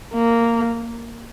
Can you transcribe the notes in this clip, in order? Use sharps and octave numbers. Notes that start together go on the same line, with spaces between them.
A#3